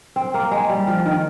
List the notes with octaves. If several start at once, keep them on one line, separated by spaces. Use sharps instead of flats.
C4
A#3
G#3
G3
F3
D#3